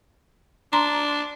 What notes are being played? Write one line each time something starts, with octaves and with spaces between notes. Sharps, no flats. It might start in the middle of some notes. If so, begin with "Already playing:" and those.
D4 A#5 C6